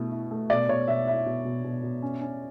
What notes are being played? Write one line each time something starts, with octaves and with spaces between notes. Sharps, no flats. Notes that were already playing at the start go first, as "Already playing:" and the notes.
Already playing: B2 A3 E4
E4
A3
B2 D5
B2 C#5
B2 E5
E4 E5
B2
B2
B2
B2
C#4
C#4